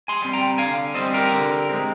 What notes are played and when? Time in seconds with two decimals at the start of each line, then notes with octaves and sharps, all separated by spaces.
0.08 G#5 C6
0.22 G3 C4
0.33 G5 A#5
0.58 D3 F5 G#5
0.94 G3 C4 C5 D#5
1.13 G4 A#4
1.32 D3
1.69 G#3 C4